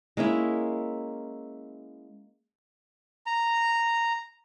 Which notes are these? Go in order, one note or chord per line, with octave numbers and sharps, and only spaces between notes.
G#3 A#3 C#4 E4
A#5